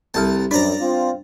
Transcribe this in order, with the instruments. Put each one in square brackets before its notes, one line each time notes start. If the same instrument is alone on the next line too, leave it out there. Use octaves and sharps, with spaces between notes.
[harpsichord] C2 A5 [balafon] G3 G4 A4
[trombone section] F#2 [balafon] D4 C5 [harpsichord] D5 A#5
[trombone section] C4 F4